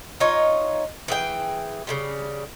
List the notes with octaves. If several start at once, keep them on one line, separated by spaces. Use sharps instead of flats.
D#4 F4 C#5
E3 G#4 G5
C#3 E3 G3